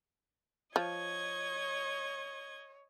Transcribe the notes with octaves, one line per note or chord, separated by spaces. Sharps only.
F3 C#5 D#5 G#6